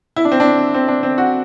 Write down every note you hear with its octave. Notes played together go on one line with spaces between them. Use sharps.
E4
D4
C4
D4
C4
D4
C4
F#4